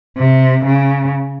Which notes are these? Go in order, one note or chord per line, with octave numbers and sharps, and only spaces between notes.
C3
C#3